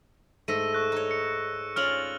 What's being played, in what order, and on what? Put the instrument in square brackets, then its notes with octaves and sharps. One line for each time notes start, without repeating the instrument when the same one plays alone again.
[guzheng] G#2 A3 [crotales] E6 A#6 D#7
[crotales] C#6 F#6 A#6
[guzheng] D#4 C#5
[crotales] C#7
[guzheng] C#4 F4 D5 [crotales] F6 F7 F#7